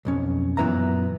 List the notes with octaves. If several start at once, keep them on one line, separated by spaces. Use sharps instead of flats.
B1 F2 C#4
F#2 A#2 E3 B3 E5 A#5